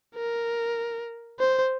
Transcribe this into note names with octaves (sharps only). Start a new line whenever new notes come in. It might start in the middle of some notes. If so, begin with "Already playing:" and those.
A#4
C5